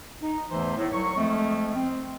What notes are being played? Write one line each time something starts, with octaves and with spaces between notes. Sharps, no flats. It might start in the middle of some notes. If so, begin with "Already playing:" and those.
D#4
E2 G#2 E3 A3 C5
A2
C2 F#3 C#6
F2 F3 G#3 A3
C4